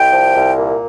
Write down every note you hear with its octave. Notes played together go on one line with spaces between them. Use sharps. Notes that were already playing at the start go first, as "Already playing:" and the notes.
Already playing: C2 G5
F3
C2
A#2